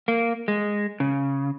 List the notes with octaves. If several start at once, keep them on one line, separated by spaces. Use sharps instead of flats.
A#3
G#3
C#3